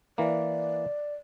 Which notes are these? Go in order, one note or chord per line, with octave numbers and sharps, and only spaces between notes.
E3 A#3 D5